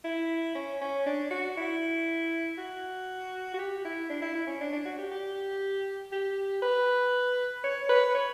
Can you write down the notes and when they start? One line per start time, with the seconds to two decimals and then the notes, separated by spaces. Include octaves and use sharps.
0.04 E4
0.55 C#4
0.81 C#4
1.06 D4
1.31 F#4
1.57 E4
2.58 F#4
3.54 F#4
3.58 G4
3.85 E4
4.10 D4
4.22 E4
4.35 E4
4.47 C#4
4.61 D4
4.73 D4
4.85 F#4
4.98 G4
5.11 G4
6.12 G4
6.62 B4
7.64 C#5
7.89 B4
8.14 C#5